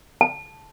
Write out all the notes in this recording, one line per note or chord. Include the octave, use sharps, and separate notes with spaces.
A5